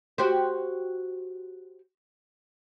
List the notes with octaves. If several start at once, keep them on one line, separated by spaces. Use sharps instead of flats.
F#4 G4 C5